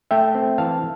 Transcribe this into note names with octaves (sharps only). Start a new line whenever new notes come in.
A3 E5 G5
C4
E3 F5 A5